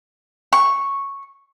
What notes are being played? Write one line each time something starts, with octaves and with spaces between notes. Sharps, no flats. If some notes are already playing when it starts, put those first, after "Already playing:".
C#6